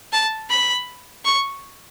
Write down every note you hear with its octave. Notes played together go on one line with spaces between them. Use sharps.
A5
B5
C#6